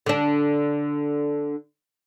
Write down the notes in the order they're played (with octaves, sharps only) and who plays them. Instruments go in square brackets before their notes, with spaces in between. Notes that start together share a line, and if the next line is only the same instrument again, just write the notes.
[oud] D3 D4